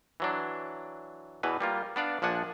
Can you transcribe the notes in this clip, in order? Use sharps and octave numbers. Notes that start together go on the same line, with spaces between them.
E3 F#3 D4
E2 B2 E3 B4
G3 A#3 F4
B3 D4 D5 F5
A#1 F3 D4 F#5 G#5